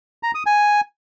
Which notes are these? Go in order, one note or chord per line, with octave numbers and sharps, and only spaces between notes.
A#5
D#6
G#5